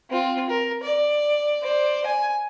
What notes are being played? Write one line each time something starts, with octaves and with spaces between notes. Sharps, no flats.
C4 F4
A#4
D5
C5 D5
G#5